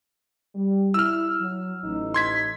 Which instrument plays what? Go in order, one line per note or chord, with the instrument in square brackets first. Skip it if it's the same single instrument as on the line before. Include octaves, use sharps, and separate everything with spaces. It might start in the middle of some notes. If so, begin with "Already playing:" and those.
[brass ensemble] G3
[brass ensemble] E4 [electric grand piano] E6 F6
[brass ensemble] F#3
A1 D#4
[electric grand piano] C6 G#6 B6